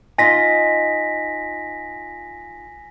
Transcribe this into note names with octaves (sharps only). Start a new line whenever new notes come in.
D#4 F4 D#5 G#5 A#6 B6